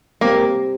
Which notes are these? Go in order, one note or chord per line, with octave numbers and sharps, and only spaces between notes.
G3 A#3 C4 G4